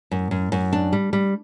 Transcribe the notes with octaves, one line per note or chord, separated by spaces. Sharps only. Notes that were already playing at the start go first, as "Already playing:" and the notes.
F#2
F#2
F#2
D4
G3
G3